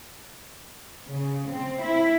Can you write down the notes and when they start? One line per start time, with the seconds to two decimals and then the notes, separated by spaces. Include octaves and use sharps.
1.09 C#3
1.49 C4
1.82 E4